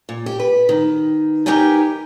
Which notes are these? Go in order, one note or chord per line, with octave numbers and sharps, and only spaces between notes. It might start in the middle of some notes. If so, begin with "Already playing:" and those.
A#2
G4
B4
D#3
D#4 G4 A#4 B4 G5 G#5